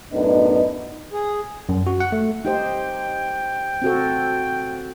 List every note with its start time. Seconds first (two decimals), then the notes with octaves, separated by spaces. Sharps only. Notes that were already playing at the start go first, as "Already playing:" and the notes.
0.13 F#2 A2 B3 D4 D#4 D#5
1.12 G#4
1.69 F#2
1.87 F#4
2.00 F#5
2.12 A3
2.45 D#4 G4 C5 G5
3.82 C4 F#4 A4